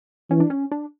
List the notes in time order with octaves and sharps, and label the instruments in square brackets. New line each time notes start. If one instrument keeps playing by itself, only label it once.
[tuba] E3 [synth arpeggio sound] C#4
[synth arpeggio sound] D4
C#4
D4